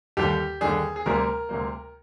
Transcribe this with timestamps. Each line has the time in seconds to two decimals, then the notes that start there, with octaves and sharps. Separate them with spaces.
0.17 D#2 D3 G3 D4 G4
0.61 D#2 D3 G3 D4 G#4
0.96 G#4
1.06 D2 C3 G3 A#3 A#4
1.49 D2 C3 G3 A#3